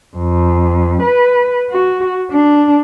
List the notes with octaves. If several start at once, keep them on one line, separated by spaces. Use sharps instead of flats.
F2
B4
F#4
D4